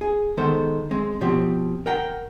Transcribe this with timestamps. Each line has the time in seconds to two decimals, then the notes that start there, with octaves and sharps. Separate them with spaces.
0.01 G#4
0.37 D#3 G#3 B3 A4 C5
0.91 G#3 C4
1.21 B2 F3 C4 G4
1.86 A#4 F#5 G5 A#5